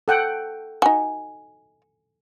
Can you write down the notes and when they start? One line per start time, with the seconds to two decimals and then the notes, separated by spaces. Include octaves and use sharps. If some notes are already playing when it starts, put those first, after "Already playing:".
0.08 A4 F#5 G5
0.82 D#4 F#4 G#5